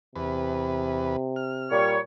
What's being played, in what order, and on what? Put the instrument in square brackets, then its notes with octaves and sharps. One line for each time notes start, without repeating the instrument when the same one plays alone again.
[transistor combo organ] E2 B4 [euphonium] C3
[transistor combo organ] F6
[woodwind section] A#2 G3 C#5